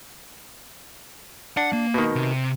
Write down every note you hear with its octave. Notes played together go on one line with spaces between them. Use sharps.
D4 F#5
A#3
B2 D#3
C3